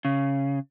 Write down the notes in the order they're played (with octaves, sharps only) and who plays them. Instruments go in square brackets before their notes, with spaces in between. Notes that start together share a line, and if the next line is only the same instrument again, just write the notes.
[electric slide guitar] C#3